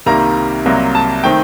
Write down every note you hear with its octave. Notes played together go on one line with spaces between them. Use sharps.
C2 C3 D#3 G3 A#3 A#5
C2 C3 F#3 A#3
A5
D#3 A3 C4 G5